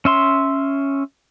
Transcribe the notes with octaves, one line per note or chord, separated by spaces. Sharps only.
C#4 E5 C6